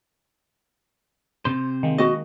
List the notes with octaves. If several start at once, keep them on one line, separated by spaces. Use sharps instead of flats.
C3 C5
D#3 G#3 A#3
F#4 D#5